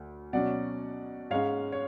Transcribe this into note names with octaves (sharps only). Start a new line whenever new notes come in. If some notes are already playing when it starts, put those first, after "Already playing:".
Already playing: D2
B2 F#3 C#4 D5 F#5
G#2 G#3 C#4 C#5 F5
C#5